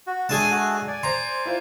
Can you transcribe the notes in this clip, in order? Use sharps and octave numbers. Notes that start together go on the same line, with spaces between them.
F#4
G#3 A3 D4 G#4 G#5 A5
A3 F#4
D5 G#5
C5 A#5 C6
E4 F4 C5